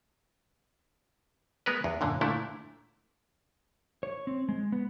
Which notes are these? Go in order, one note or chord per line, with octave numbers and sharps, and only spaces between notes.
G#3 B3 A#4 B4
E2
F#2 A#2 D3
A#2 D3 A3 E4
C#5
C4
G#3
B3